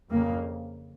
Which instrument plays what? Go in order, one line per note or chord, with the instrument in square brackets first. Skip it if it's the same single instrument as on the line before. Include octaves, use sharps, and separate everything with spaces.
[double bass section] F2 C#3 A#3